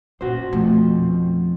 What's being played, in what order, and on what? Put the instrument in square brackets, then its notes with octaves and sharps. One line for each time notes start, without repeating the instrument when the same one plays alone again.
[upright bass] F#2 B3 [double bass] A#2 [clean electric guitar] F#4 C5
[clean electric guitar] F2 F3 [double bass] B2 [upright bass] A3